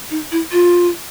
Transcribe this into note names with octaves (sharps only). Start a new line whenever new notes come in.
D#4
E4
F4